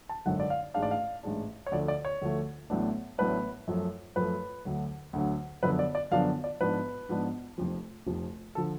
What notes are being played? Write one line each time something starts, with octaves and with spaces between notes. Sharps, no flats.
A5
G#1 F#2 D3 F#5
D5
F5
A1 G#2 G#3 D4 F5
D5
F5
A1 G#2 G#3 D4
C#5
D2 D3 F3 A3 D5
D5
C#5
D2 D3 F3 A3
A1 A2 F#3 B3 D4
A1 A2 F#3 B3 D4 B4
F#2 F3 A3
F#2 F3 A3 B4
D2 D3 F#3
D2 D3 F#3
F#2 D3 F3 B3 D4 B4
D5
D5
F#2 D3 F3 B3 D4 F5
D5
G#2 F3 B3 D4 B4
G#2 F3 B3 D4
F1 F2 F3
F1 F2 F3
D3 F3 A4